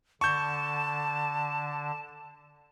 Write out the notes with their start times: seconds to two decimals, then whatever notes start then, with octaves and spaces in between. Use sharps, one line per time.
0.21 D3 A5 C#6 G6